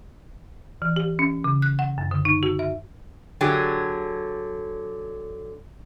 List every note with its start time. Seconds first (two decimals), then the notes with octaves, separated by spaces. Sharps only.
0.82 E3
0.96 G4
1.19 C#4
1.44 C#3
1.62 F#6
1.79 F#5
1.98 F#2
2.11 D3
2.25 D#4
2.43 F#4
2.59 E5
3.41 D3 F#3 G4 G#4